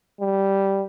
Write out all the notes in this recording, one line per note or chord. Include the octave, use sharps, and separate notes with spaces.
G3